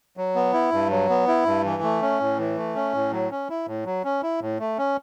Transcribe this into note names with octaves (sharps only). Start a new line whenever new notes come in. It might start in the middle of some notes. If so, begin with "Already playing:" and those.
F#3
B3
E4
G2
F#3
B3
E4
G2
E3
A3
C#4
A2
E3
A3
C#4
A2
F#3
C#4
E4
A2
F#3
C#4
E4
A2
A3
C#4